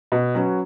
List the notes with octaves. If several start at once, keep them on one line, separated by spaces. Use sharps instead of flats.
B2
F#3 C#4 F#4 B4